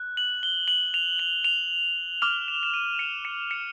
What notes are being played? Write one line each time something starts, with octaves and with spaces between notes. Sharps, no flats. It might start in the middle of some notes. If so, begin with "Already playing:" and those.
Already playing: F#6
F#7
G7
F#7
F7
F#7
F7
D6 F6 F7
E7
E7
D#7
C#7
C#7
C#7